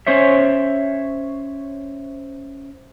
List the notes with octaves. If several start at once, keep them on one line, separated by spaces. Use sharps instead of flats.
C#4 C5 C#5 E5